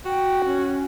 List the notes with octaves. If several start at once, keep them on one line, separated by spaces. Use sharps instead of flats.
F#4 G5
C#4